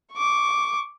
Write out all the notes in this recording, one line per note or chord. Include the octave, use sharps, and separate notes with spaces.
C#6 D6